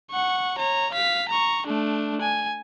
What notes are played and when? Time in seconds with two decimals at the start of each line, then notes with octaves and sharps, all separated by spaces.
0.11 F#5 C#6
0.58 C#5 A#5
0.93 F5 B6
1.29 A#5 C#6
1.67 A3 D4
2.21 G#5